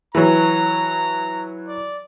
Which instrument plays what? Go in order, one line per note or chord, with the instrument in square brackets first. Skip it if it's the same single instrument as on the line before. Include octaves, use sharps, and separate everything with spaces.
[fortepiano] E3 F#3 [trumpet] A#5
[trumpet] D5